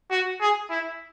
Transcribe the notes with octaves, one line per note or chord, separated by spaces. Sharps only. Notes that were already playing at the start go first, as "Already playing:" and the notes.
F#4
G#4
E4